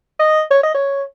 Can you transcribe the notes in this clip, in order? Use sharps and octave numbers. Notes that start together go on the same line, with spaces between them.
D#5
C#5
D#5
C#5